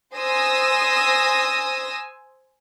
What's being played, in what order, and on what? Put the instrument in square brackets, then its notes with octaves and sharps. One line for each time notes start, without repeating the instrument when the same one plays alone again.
[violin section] C5 G#5 D#6 E6 A#6